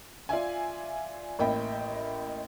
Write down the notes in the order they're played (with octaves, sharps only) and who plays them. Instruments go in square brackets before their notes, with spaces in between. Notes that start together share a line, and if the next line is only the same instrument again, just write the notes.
[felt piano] F4 D5 E5 G#5
A1 A#3 D#5 E5 G5 B5